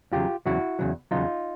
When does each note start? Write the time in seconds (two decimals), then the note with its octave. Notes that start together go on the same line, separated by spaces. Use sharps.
0.12 E2 C#3 F#3 F4 G4
0.46 E2 C#3 F#3 E4 F#4
0.79 E2 C#3 F#3
1.11 E2 C#3 F#3 D#4 F4